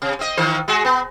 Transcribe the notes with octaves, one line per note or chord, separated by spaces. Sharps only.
C3
C4 D#5
D#3 E3 C5
G#3 F#4 G#4
B3